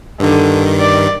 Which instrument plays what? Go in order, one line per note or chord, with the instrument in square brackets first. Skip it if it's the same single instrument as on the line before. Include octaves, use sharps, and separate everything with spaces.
[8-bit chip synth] G2 D#3 [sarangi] D3
[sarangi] D5